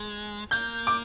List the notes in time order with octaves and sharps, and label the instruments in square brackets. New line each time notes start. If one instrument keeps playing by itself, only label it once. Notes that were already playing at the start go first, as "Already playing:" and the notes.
Already playing: [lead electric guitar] G#3
[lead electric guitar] A#3 [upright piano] G6
[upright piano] D6